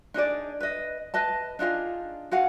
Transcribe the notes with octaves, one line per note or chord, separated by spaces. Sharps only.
D4 D#4 G#4 D5
B4 D#5
B4 D#5 A5
D4 D#4 F4 G#4
F#4 G#4 F5 F#5